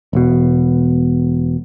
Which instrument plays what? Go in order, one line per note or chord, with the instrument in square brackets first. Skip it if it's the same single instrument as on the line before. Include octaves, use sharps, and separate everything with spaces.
[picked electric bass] E1 B2